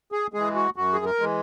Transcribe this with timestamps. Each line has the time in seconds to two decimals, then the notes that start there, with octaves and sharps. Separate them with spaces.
0.12 G#4
0.33 E3 G#3 G#4
0.55 F#4
0.76 F#2 F#4
0.93 G#4
1.05 A#4
1.20 E3 G#3